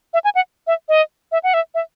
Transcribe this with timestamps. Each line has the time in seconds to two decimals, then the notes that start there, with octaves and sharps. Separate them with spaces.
0.14 E5
0.24 G#5
0.35 F#5
0.67 E5
0.89 D#5
1.32 E5
1.44 F#5
1.54 E5
1.75 E5